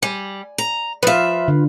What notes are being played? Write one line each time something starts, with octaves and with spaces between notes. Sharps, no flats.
G3 G#5
A#5
F3 F4 B4 E5
D3